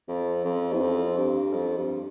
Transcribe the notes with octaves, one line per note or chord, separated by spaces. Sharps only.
F2
F2
E2
F2
G2
F2
G2